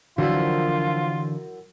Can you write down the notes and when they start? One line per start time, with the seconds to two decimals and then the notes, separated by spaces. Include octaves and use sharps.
0.18 F#2 D3 E3 F3 D4 E4 F4